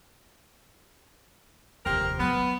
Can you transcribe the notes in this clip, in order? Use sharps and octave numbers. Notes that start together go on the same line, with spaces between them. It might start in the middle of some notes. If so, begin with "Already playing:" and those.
F1 D#2 C4 G4 A#4
F#3 B3